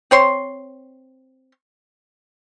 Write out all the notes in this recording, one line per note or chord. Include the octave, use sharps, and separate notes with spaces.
C4 C#5 C6